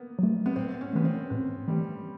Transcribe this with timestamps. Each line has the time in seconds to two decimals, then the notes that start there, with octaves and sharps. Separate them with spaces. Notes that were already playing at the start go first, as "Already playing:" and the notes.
Already playing: A#3 B3
0.19 F#3 A3
0.46 B3
0.56 A2 C4
0.81 C#4
0.93 E3 A3 B3
1.05 C4
1.30 A2 B3
1.68 E3 G3 A3